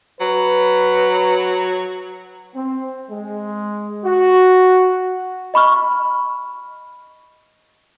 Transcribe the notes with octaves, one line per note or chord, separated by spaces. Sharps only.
F#3 B4
C4
G#3
F#4
D#5 B5 C#6 F6